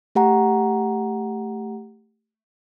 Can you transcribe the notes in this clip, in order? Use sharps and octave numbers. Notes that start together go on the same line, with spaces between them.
A3 G4 F#5 A#5